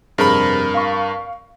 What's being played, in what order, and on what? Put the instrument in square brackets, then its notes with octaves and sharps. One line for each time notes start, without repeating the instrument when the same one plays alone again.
[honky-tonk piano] F1 G#4 C5 [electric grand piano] G2 A#4 B5
[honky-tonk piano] F5 C#6